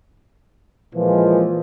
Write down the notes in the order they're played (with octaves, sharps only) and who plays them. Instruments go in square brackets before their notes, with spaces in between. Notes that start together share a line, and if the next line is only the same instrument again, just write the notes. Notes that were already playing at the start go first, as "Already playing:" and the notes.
[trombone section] A#2 E3 F3 G#3